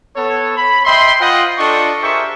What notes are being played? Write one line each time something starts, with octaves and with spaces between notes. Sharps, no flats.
B3 A4 C#5
B5
D#5 E5 G5 B5 C6
F4 C5 D#5 F#5 G5
D4 F4 A4 D#5 C#6
G4 G#4 A#4 C5 E5 C#6